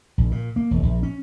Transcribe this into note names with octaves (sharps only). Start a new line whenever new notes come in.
A#1
A#2
A#3
E1
A#1
C#4